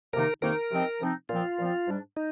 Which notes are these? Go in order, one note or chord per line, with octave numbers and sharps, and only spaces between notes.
F2 C3 D#3 A#3 D#4 A#4
F2 C3 D#3 A#3 D#4 A#4
C3 F3 C4 D#4
C3 F3 C4 D#4
A#2 F3 C4 F4
A#2 F3 C4
G#2 G3 D4
D#4